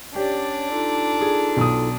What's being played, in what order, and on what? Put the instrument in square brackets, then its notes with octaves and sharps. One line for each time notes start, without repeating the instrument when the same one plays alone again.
[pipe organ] C#4 C#5 D5 [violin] D4 [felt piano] G4
[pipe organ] D#4 F4 A4
[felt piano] G#4
B1 D#6